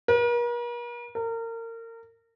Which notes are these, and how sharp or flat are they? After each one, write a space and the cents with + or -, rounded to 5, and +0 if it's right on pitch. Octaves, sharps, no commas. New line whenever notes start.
A#4 +45
A#4 -30